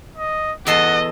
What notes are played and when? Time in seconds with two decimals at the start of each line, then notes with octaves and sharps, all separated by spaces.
0.17 D#5
0.67 E2 A4 D#5 F#5 C6